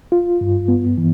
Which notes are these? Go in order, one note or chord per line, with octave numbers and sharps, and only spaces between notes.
F4
G2
B3
E3